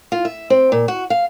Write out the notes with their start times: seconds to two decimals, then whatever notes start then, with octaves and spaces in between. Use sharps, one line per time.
0.12 F4
0.25 E5
0.50 C4
0.72 A#2
0.88 F#4
1.10 F5